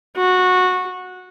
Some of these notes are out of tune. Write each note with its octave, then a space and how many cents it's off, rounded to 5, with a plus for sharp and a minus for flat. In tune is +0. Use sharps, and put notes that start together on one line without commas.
F#4 -15